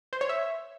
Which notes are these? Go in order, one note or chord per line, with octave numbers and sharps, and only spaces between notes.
C5
C#5
E5